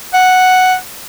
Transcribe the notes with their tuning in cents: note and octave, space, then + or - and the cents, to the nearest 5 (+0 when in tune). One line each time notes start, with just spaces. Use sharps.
F#5 +0